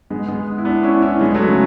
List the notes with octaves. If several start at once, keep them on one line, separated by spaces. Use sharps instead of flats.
G#3 B3
G#3 B3
E4
B3 D4
C#4 E4
C#4 E4
G#3 B3
F#3 A3
C#3